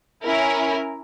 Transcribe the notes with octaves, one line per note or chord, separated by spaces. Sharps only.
C#4 E4 A#4